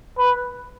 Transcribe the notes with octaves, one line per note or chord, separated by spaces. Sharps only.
B4